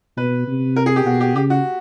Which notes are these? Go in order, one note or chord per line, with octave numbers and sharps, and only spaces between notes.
B2 B4
C3
A#4
G#4
G4
B2 F#4
G4
C#3 G4
F#4